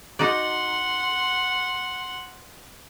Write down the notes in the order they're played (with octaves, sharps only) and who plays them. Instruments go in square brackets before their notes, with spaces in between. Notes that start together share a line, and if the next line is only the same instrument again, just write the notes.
[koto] D#4 F#4 D5 [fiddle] F#5 C6